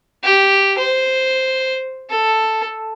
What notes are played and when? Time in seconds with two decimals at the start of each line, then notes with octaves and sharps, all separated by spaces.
0.23 G4
0.78 C5
2.10 A4